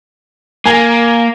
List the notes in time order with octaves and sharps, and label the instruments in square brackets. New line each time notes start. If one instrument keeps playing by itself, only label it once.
[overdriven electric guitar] A#3 [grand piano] G#5